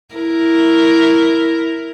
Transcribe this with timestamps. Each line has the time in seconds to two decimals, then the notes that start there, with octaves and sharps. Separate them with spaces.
0.15 E4 A#4